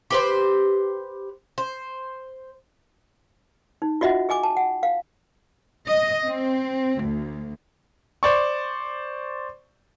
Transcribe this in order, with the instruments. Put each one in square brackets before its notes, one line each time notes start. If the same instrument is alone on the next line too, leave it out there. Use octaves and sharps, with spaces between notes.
[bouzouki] G4 B4 C5
C5
[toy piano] D#4
F4 F#4 D#5 E5 F#5
G#4 D#5 G#5 D6
A5
F#5
F5
[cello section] D#5
C4
D2
[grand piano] C5 D5 C#6